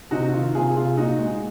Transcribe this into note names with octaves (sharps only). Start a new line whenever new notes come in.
C3 D#4 F#4
D#3 F4
C3 F4 G#4
C3 F4 G#4
A#2 D#4 F#4
G#3